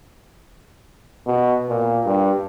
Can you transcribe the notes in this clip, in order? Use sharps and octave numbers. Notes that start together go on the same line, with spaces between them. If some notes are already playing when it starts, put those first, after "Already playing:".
B2
A#2
G2